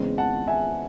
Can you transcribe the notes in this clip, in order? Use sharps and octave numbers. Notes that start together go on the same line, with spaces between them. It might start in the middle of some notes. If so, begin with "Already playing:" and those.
Already playing: E2 C#3 G#3 C4
F#5 A5
E5 G#5